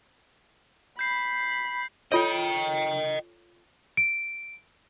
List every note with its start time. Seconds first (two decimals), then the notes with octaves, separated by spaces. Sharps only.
0.99 B5 G6 C7
2.12 F4 A4 C#5 D#5 G5
3.97 D7